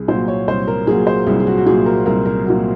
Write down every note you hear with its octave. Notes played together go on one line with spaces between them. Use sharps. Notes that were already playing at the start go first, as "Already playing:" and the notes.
Already playing: C2 G#4
A#2 F#3 C5
C#5
C2 C5
A#4
A#2 F#3 G#4
C5
C2 G#4
G#4
F#4
F#4
A#2 F#3 G#4
A#4
C2 A#4
A#4
A#2 F#3